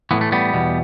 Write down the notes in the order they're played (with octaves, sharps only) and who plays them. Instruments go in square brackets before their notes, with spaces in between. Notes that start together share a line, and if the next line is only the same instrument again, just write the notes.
[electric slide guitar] A2 E3 B3
A3
G3 B3
E2 B2